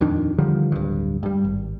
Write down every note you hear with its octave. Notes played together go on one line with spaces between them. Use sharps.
D#1 F2 D#3 D4
D3 D#3 F3 G3
D1 G2
G2 G3
G#1